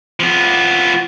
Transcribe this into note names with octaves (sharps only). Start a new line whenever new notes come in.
F3 B3